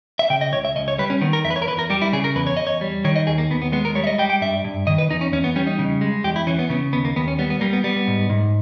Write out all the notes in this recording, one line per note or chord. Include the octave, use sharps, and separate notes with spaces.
E5
C#3 G5
D#5
C#2 C#5
E5
C#2 D#5
C#5
G3 B4
C#4
D#3 B3
A#4
E2 E5
B4
C#5
A#4
E2 B4
A#4
G3 G4
E4
C#3 G#4
A#4
E2 B4
C#5
E2 D#5
C#5
G3
D#3 C#5
D#5
D#2 G#4
A#3
D#2 B3
B3
G#3 B3
A#4
G3 C#5
E5
D#5
G3 G5
G5
G2 E5
G2
D#3 D#5
B4
E2 D#4
C#4
E2 C#4
B3
G3 C#4
D#4
C#3
G#3
E2 G4
E4
E3 C#4
B3
C#3 B3
D#2 B3
A#3
D#2 B3
C#4
G3 B3
B3
G3 A#3
B3
G3 B3
B3
G#2
G#2